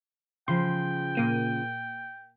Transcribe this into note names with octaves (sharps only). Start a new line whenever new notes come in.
C#3 F3 G5 C6
A#2 A#3 D#7